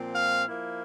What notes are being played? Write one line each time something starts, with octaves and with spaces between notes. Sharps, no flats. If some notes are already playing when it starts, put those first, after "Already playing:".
Already playing: A#2 F3 C4
F5
F3 A#3 E4